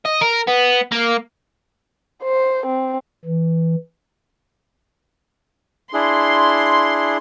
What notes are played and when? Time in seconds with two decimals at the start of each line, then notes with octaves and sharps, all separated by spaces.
0.05 D#5
0.21 A#4
0.48 B3
0.92 A#3
2.23 C5
2.66 C4
3.25 E3
5.93 D4 E4 G#4 C6